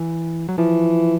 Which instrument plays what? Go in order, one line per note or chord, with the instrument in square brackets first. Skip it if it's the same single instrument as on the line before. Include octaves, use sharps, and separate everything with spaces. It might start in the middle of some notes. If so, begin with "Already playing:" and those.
Already playing: [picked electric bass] E3
F#3
[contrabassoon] E3 [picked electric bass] F3